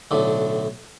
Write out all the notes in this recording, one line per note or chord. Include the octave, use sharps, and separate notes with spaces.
B1 A2 D3